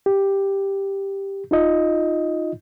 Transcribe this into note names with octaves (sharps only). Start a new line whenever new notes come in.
G4
D#4 F4 D#5